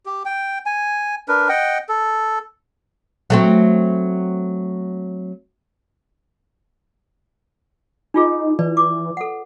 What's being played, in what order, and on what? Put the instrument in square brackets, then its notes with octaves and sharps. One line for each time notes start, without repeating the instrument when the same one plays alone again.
[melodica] G4
G5
G#5
D4 A#4 B4
D#5 F#5 G5
A4
[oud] F#3 A3 C4
[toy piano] D4 F4 G#4 [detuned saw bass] D#4
[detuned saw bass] E3 [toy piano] B4 D5
[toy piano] D6
A4 F#5